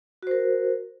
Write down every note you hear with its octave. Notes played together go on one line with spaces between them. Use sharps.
F#4 A#4 C5